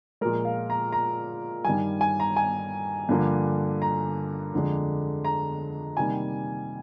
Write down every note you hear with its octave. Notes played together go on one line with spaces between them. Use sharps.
A#2 F3 G#3 A#4
F5
A#5
A#5
G2 D#3 G3 G#5
G#5
A#5
G#5
G2 D3 F3 A#3
A#5
F2 D3 G#3
A#5
C3 D#3 G3 A#3 G#5